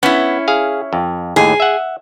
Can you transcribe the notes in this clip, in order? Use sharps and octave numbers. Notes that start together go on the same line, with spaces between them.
B3 C#4 E4
G#4 F5
F2
D#2 A2 G#4
E5 F#5